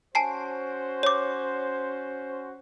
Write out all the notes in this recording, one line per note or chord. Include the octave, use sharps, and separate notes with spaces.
C#4 F#4 C5 G#5 A5 C7
C#5 D6